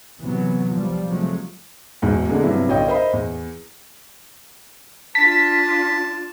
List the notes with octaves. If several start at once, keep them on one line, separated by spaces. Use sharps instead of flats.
C3 E3 F#3 B3
F3 G3
C3 F3 F#3 G#3 A3
E1 E2 G#2
B2 D3 G#3 A#3
G2 C3 F#3 B3 E4
B1 D3 C#5 D#5 F5 G5
A#4 C5 D#5 E5 B5
E2
D4 F4 A5 B6